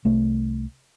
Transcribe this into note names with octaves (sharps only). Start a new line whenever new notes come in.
C2 A3